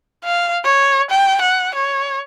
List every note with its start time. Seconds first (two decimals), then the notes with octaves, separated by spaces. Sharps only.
0.25 F5
0.64 C#5
1.10 G5
1.41 F#5
1.75 C#5